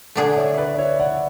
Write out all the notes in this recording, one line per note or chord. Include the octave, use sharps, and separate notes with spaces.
D3 A3 D4 G#4 D5 F#5
C#5 E5
B4 D5
C#5 E5
D5 F#5